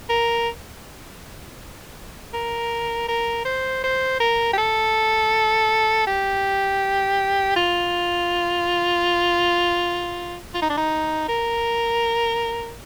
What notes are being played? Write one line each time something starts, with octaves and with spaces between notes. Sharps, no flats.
A#4
A#4
A#4
C5
C5
A#4
G4
A4
G4
F4
F4
D#4
D4
D#4
A#4